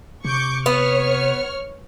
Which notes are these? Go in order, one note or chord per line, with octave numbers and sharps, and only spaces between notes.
C3 C#6 D6 G6
B3 C#5 C#6 F6